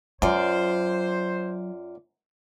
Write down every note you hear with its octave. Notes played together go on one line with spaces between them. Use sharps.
F#2 F#3 F4 C5 D5